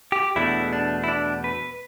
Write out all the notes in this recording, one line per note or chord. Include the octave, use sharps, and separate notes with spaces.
G4
E2 B2 A3 D4 E4
D4
E4
D4
B4